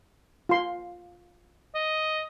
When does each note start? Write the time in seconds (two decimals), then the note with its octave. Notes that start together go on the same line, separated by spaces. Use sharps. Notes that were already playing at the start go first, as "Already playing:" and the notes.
0.49 F4 C6
1.75 D#5